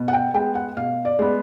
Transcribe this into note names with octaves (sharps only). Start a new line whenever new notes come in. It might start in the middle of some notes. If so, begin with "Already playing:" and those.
Already playing: B2
F#5
G5
G#3 B3 G5
F#5
B2 F5
D5
G#3 B3